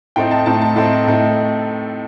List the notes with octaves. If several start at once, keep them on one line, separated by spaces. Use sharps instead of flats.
A2 A3 C4 D#4 G5
A5
A2 A3 C4 D#4 A5
A5
A2 A3 C4 D#4 A5
A2 A3 C4 D#4